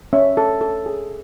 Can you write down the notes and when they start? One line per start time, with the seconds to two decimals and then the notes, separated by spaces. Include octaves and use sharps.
0.13 C#4 E5
0.37 A4
0.61 A4
0.86 G#4